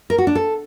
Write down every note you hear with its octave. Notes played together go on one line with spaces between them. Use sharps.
A#4
F#4
D4
A4